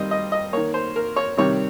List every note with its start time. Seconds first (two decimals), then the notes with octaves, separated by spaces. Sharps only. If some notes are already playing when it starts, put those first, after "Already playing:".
Already playing: D#3 G3 C4 D#5
0.11 D#5
0.32 D#5
0.53 D#3 A#3 C#5
0.74 C5
0.96 A#4
1.16 C#5
1.37 C3 D#3 G3 C#5